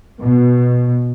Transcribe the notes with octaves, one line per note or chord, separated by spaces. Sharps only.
B2